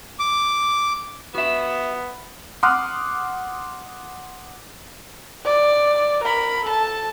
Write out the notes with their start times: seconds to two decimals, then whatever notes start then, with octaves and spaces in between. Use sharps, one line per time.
0.20 D6
1.35 B3 F#4 E5
2.63 F#5 C6 D6 D#6 F6 F#6
5.45 D5
6.24 A#4 B5
6.65 A4 A5